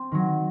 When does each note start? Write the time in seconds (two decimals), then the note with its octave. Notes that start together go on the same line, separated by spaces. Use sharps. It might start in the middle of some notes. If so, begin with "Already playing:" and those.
Already playing: C4
0.12 D#3 F#3